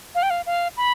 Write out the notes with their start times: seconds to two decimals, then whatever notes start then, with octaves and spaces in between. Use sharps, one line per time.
0.15 F5
0.23 G5
0.30 F5
0.46 F5
0.77 B5